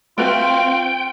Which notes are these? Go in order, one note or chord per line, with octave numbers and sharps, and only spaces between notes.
A3 C4 F4 F#4 B4 G5